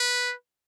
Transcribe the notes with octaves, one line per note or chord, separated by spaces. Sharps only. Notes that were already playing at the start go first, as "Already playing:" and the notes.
Already playing: B4